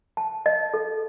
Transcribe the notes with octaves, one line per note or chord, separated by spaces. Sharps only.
A5
D#5
A4